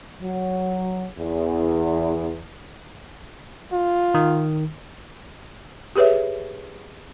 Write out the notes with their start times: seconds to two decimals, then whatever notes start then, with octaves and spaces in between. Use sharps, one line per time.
0.22 F#3
1.18 E2
3.73 F4
4.14 D#3
5.96 G4 G#4 B4 C#5 E5